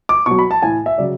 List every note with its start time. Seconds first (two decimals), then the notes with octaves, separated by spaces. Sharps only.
0.09 D6
0.26 B2 F#3 C#6
0.39 B5
0.51 A5
0.62 A2 E3 G#5
0.86 E5
0.98 C#3 F#3 D5